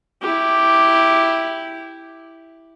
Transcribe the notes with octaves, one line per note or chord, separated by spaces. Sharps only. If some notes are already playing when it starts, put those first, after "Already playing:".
E4 G4